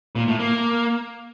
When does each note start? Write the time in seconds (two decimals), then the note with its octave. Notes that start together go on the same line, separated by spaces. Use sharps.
0.16 A#2
0.27 A2
0.39 A#3